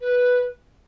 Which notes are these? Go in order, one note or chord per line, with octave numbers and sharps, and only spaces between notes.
B4